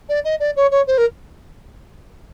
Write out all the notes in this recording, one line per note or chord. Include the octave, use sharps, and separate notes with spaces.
D5
D#5
D5
C#5
C#5
C5
A#4